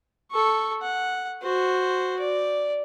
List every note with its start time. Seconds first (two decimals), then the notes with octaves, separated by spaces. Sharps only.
0.32 A4 C#6
0.82 F#5
1.42 F#4 C5
2.19 D5